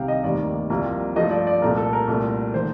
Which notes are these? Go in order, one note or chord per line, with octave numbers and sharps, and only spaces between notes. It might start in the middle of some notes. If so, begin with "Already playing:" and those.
Already playing: C2 C3 D#3 F5 G5
D#5
F1 D#2 D#3 G3 A#3 D5
C2 C3 F3 A#3
G2 F3 A3 D#5
D5
D5
C2 A#2 A3 A#4
A4
A#4
C2 A#2 A3
D#3 A3 C5